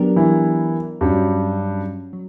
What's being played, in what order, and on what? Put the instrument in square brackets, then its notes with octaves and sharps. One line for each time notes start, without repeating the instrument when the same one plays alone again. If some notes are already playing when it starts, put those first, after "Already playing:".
Already playing: [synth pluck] F#3 B3 D4 G4 A#4
[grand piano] E3 E4
[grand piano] G2 G3 [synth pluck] F#3 C#4 F#4
[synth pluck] F#3